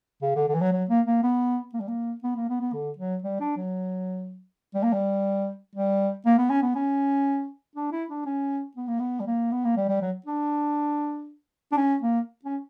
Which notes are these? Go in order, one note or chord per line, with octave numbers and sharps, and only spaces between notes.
C#3
D3
D3
E3
F#3
F#3
A#3
A#3
B3
A#3
G3
A#3
B3
A#3
B3
B3
D3
F#3
G3
D4
F#3
G3
A#3
G3
G3
A#3
B3
C#4
B3
C#4
D4
E4
D4
C#4
B3
A#3
B3
G3
A#3
B3
A#3
G3
G3
F#3
D4
D4
C#4
A#3
C#4